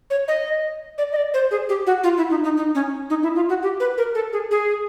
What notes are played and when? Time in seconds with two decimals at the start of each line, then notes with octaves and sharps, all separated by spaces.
0.10 C#5
0.28 D#5
0.98 D5
1.12 D#5
1.16 D5
1.34 C5
1.51 G#4
1.69 G4
1.86 F#4
2.03 F4
2.17 E4
2.30 D#4
2.44 D#4
2.57 D#4
2.75 C#4
3.10 D#4
3.23 E4
3.35 F4
3.49 F#4
3.63 G4
3.80 B4
3.98 A#4
4.15 A4
4.33 G#4
4.51 G#4